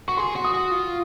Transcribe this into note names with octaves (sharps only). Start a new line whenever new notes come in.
F#4 C#6
G#4 C6
F#4
D#6
F#4
F4